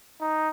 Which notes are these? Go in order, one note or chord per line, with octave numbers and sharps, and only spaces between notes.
D#4